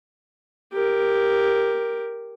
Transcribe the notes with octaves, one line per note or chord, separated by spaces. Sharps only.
G4 A#4